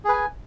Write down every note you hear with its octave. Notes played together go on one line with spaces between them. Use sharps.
G#4 B4 G#5